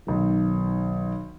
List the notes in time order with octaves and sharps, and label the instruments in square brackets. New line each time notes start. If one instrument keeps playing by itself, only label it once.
[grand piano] B1 D#3